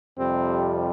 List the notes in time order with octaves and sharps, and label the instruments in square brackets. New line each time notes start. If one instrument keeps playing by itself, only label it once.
[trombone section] F2 C3 G3 C4